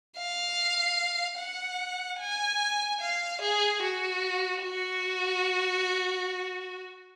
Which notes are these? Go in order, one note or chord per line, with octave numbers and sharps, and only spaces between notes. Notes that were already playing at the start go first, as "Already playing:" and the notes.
F5
F#5
G#5
F5
G#4
F#4
F#4